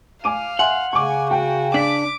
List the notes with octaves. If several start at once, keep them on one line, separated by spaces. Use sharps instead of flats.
F5 G#5 D6 D#7
E5 F#5 G#5 C6
C#3 G#5 C#6 D6
F#4 G5
D4 D6 B6